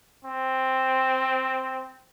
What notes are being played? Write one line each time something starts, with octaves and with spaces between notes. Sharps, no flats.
C4